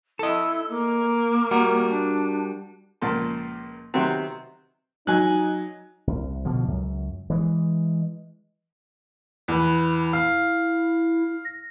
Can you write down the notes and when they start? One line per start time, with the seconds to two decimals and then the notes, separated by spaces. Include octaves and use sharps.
0.19 E4 A4 D#5
0.69 A#3
1.51 G3 F#4 A#4
1.89 D4
3.02 C#2 A#2 F3 A#3 A5 C6
3.94 C3 D#3 F#3 B3 C4
5.07 F#3 D#4 G#5 F#6
6.07 C2
6.45 B2 D3 F3
6.67 C#2 F#2
7.30 E3 G#3
9.48 E2 E4 B4
10.13 F5
11.45 A#6